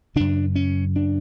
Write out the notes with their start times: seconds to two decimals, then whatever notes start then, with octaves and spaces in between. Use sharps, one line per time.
0.16 F#2 C#3 D4
0.55 C#4
0.96 D4